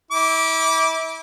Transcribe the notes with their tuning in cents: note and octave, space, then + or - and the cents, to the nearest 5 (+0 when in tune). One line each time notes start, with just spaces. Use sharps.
E4 -35 D6 -10